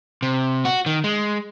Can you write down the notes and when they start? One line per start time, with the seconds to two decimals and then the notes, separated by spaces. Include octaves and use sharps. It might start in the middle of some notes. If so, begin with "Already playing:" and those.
0.22 C3
0.65 F#4
0.86 D#3
1.04 G#3